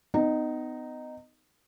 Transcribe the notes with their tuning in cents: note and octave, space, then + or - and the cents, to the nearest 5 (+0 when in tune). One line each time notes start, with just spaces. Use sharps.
B3 +35 D#4 -10